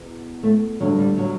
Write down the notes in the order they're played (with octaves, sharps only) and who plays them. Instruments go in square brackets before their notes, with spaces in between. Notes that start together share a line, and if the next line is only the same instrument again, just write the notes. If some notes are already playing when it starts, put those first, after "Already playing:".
Already playing: [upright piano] E2 B2
[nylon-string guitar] A3
[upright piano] G2 D3 A3 [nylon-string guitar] F#3
[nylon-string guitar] G3
F#3